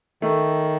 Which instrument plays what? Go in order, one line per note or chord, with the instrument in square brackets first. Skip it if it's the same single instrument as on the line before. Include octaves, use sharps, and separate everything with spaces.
[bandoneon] D#3 [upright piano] A3